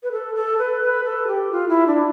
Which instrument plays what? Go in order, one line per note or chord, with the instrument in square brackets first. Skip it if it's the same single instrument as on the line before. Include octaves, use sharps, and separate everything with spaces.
[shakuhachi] B4
A4
A4
B4
B4
A4
G4
F4
E4
D4